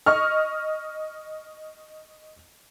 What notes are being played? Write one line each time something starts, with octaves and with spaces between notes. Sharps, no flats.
D#5 C#6 F6